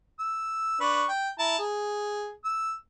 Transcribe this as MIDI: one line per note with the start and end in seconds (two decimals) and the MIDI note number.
0.19 0.79 88
0.81 1.05 62
0.81 1.05 71
0.81 1.05 85
1.08 1.29 79
1.39 1.58 64
1.39 1.58 81
1.39 1.58 82
1.59 2.31 68
2.45 2.73 88